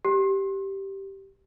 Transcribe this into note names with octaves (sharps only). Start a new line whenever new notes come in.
G4